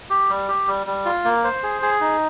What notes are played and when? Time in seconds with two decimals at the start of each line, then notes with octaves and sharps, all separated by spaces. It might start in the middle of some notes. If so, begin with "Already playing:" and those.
0.10 G4
0.29 G3
0.48 G4
0.68 G3
0.87 G3
1.05 F4
1.25 A#3
1.44 C5
1.63 G#4
1.82 G#4
2.01 D#4